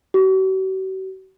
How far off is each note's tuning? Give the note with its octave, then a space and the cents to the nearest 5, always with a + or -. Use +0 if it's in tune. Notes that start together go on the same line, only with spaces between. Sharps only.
F#4 +45